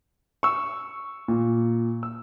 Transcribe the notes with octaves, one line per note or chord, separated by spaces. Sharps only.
C#6 E6
A#2
E6